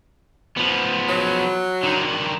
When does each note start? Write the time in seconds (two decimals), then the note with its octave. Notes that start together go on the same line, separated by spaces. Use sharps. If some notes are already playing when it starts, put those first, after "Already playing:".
0.57 F3 B3
1.09 F#3
1.83 D3 D#3